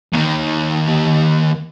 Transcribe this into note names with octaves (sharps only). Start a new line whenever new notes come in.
D#2 D#3